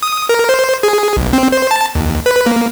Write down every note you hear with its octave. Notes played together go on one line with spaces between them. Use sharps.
D#6
A#4
C5
G#4
B1
C4
C5
A5
D#2
B4
A#3